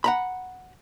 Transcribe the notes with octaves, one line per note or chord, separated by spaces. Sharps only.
F#5 A#5 B5